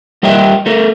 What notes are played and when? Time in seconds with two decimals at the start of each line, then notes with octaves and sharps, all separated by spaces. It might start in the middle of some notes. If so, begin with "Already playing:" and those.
0.23 G3 A#4 D#5 E5 G5
0.66 A3 A4 A#4